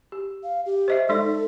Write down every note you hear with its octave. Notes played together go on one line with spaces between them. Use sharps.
G4
F5
G4
C5 D#5 E5
G#3 D#4 A4 D5